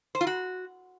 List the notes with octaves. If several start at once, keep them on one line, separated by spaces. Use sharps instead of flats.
C5
F4
F#4